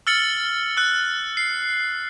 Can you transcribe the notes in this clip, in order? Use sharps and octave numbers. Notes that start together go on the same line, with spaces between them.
E6 F6 A6 C#7 F#7
E6 F#6 C#7
C7